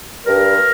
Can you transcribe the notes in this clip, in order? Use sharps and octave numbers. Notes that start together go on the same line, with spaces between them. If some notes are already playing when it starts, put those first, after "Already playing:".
G2 A#4